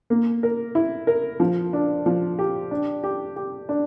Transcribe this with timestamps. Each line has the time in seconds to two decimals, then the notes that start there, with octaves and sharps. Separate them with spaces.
0.10 A#3
0.43 A#4
0.75 E4
1.07 A#4
1.40 F3
1.73 D4
2.06 F3
2.39 G4
2.71 D4
3.03 G4
3.36 G4
3.69 D4